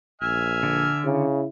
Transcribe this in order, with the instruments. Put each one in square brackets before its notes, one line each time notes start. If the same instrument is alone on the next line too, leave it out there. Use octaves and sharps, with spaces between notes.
[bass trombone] A#1 [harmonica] E5 G#5 F6
[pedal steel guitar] D3
[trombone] C#3 [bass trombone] E4